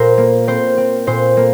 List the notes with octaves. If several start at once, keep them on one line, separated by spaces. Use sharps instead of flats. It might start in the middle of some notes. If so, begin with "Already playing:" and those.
Already playing: A#2 A#4 C5
A#3
C4 C5
C4
A#2 C5
A#3